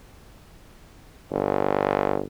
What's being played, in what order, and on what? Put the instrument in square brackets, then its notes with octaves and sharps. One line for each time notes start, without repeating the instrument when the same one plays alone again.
[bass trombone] G1